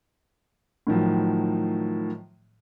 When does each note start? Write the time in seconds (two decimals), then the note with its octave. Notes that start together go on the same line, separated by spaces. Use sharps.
0.87 A2 D#3 F3 F#3